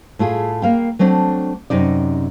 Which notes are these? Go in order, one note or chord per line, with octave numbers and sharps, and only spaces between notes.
A2 A3 F4 G#4
A#3 F5 G5
F#3 A3 C4 D4 A5
F#2 C3 D#4 D5